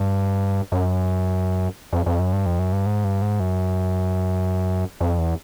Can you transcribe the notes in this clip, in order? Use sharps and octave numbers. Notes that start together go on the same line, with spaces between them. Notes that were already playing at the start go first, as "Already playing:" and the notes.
Already playing: G2
F#2
F2
F2
F#2
G2
F2
F#2
G2
G#2
G2
G#2
F#2
F2
E2